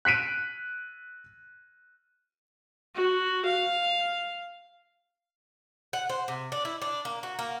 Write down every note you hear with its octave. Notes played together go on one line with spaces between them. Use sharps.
F#6 B6 D7 D#7
F#4
F5
F#5
C5
C3
D4
E4
D4
A#3
F#4
A#3